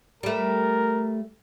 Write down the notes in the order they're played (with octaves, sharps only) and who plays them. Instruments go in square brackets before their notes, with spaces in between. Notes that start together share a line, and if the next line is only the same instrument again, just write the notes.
[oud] G3 A3 [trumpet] A#4